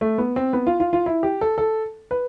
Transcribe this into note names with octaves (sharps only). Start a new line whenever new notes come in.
A3
B3
C4
B3
F4
F4
F4
E4
G4
A4
A4
B4